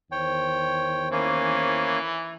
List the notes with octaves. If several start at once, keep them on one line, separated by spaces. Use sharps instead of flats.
E2 D#3 C5 C#5 G5
E3 A#3 C#4